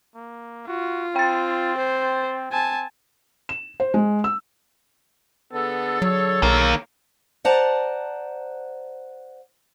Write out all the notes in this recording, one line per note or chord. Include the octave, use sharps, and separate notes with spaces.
A#3
F4 F#4
C4 G5 A6
C5
C4 G#5 A5
E7
C5
G#3
E6
D3 B3 G#4 A4
F#3 C#5
B1 D#3 A#3
C5 D5 F#5 A5 A#5